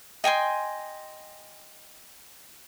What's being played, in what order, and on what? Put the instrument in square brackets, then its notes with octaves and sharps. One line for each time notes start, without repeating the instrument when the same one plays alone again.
[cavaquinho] D#5 G5 G#5 C6